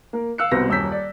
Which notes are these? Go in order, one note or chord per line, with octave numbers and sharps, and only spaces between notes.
A#3 A#4
F5 E6 F#6 C#7
C2 B2 C4 F#4 B4 A#6
D#1 F#2 E6 G6 B6
D5